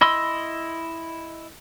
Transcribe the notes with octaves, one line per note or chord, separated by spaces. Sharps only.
E4 D#5 B5 C6 E6